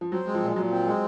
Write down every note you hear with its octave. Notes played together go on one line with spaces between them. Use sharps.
F3
F#3 C4
G#3
F3
A#2
A#2 F#3
C4
G#3